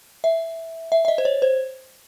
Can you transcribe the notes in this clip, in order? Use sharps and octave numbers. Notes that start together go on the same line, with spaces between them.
E5
E5
E5
D#5
C5
C#5
C5